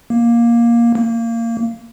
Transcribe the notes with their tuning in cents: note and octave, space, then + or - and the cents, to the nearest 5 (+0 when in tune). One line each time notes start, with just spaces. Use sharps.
A#3 +10
A#3 -20